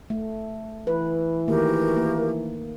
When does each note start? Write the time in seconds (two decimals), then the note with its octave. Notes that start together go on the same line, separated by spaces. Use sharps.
0.10 A3
0.87 E3 B4
1.48 D#3 A3 A#3 F#4 G4 A#4
1.97 A#3